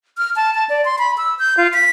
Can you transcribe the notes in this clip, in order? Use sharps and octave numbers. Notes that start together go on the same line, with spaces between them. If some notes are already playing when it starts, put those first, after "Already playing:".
F6
A5
A5
D5
C6
B5
E6
G6
F4
B6